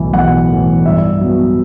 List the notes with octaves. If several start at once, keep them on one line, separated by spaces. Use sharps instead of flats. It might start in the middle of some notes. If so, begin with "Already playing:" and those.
Already playing: B1 A2 E3
B1 F#5
A2 E3
G2 E5
F#3 B3